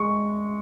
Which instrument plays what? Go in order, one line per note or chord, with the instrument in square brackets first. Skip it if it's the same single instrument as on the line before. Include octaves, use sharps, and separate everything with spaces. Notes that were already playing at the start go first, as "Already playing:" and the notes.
Already playing: [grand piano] G#3 C#6